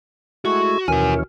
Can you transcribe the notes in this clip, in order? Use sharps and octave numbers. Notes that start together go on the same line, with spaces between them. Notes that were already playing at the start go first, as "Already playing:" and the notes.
G#3 A3 E4 F#4 C#6
D#2 B2 E3 C#4 F#4 A#4 G#5